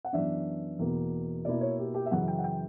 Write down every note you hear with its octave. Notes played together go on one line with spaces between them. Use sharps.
F#5
F#2 E3 B3 D4 E5
E2 B2 A#3
B2 A#3 E4 D5
C#5
G4
G4
E5
F#2 C#3 E3 F#5
G5
F#5
G5